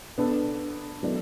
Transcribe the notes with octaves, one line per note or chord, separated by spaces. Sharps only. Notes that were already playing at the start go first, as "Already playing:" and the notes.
B3 D4 A4
F#3 B3 E4 A4 D5